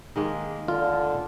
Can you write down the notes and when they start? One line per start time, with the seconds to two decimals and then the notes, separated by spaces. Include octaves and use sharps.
0.16 D#3 G#3 A#3
0.68 D3 F4